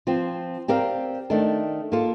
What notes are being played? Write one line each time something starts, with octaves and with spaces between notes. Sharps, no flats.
F3 C4 F4
C4 G4 A#4 D5 F5
D#3 A3 D4 A4
A#3 F4 A4